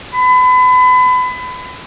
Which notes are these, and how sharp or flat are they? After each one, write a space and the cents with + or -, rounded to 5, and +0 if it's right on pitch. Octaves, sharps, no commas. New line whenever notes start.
B5 +30